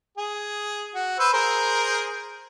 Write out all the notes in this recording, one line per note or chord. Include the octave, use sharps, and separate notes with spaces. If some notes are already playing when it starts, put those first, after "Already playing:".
G#4
F#4
B4 C5 E6
G#4 A#4 C5